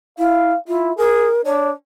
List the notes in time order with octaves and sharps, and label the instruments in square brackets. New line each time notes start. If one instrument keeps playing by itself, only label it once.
[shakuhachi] E4 [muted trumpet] F5
[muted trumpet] E4 [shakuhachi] F4
[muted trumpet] G#4 [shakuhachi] A#4
[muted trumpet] D4 [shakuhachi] C#5